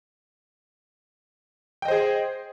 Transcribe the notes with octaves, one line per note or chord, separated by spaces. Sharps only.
G#4 C5 D#5 G5